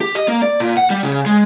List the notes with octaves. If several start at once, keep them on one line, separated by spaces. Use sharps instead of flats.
G4
D#5
A#3
D5
A#2
F#5
G3
C#3
G#3